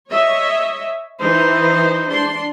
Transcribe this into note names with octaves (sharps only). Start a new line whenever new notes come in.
C#5 D#5 E5
E3 D#4 C5
D4 C6